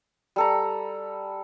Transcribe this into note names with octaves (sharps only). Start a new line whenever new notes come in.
G3 A4 A#5